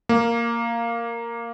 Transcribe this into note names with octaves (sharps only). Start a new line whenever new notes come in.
A#3